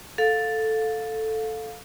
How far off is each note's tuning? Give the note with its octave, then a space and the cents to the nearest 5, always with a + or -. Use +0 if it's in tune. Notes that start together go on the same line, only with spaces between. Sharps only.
A4 +0 F5 +20